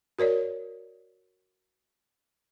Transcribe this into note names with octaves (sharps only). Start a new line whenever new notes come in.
F#4 A#4 C#5 D5